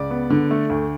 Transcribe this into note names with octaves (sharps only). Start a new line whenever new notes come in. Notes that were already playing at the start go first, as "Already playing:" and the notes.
Already playing: C#2 D5
B3
D3
A3
D2